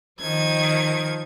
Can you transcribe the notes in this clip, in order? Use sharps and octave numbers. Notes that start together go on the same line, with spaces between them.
D#3 F3 G#6